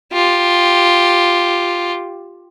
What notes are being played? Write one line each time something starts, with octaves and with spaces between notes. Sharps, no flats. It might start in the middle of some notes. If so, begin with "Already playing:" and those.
F4 G4